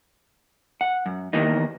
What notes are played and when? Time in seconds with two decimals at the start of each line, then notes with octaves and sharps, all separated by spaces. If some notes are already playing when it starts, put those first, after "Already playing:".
0.81 F#5
1.06 F#2
1.33 E2 D#3 E3 A#3 D#4